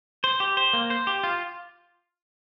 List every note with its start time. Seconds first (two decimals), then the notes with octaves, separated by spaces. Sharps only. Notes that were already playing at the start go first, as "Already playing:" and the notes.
0.24 C5
0.40 G4
0.57 C5
0.73 A#3
0.90 C5
1.07 G4
1.24 F4